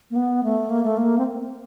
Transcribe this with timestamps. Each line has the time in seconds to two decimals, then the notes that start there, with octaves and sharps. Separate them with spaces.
0.11 A#3
0.16 B3
0.43 A3
0.69 A#3
0.83 A3
0.97 A#3
1.18 C4